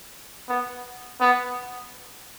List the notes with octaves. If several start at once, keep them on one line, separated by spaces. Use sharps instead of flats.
B3
B3